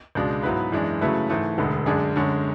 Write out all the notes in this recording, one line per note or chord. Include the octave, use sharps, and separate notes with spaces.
C#2 B2 G#3 D4
G#2 F#3 B3 E4 B4
F#2 E3 G#3 D4
C#3 F#3 A3 E4 B4
G#2 E3 A3
E1 D2 D3 G#3 B3
F#2 D3 G#3 D4 G#4
F#2 D3 G#3 C#4